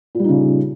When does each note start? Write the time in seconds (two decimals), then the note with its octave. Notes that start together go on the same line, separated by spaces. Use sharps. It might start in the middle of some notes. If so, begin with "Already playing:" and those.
0.15 A#2
0.19 G3
0.24 D#4
0.29 C#3